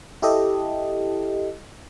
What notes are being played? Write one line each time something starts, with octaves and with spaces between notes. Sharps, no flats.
E4 G4 A4 D#5